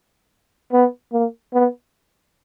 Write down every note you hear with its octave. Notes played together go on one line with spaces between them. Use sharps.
B3
A#3
B3